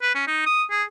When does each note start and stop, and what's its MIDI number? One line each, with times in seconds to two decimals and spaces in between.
0.02 0.12 71
0.15 0.25 61
0.27 0.45 63
0.46 0.63 87
0.70 0.83 68